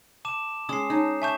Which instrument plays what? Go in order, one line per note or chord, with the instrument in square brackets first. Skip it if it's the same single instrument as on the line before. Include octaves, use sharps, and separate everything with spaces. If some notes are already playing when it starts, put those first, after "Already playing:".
[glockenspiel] A5 D6 E7
[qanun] G#3 C#4 [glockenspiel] D#6 C7
[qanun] D#4 [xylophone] C#5 A5
[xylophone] E5 A5 G6 [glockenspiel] G#5 C#6 E7